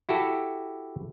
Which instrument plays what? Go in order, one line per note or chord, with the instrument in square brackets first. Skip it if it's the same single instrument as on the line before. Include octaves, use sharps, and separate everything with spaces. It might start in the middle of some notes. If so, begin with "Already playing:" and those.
[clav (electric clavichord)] E4 F#4 G4 A4